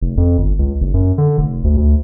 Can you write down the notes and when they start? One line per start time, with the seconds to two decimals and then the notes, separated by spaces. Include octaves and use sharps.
0.01 F1
0.17 F2
0.38 G1
0.59 C#2
0.81 F#1
0.94 F#2
1.18 D3
1.38 F1
1.64 D2
1.77 D2